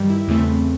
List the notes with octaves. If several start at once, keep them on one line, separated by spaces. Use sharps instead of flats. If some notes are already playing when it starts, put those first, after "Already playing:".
Already playing: G2 D#3 G3
E4
E2 C#3 E3 A3 C4